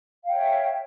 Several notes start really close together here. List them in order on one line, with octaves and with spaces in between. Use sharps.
F5 G5 C#5 E5